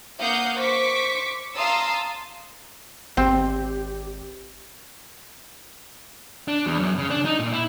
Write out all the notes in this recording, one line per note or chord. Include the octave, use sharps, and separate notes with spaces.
A#3 F5 F#5 D#6 G6
C5 C#6 D6 B6
F5 A5 A#5 C6 D#6 E6
G#1 C4 G4
D4
E2
F#2
C#3
D4
D#4
A#2
E4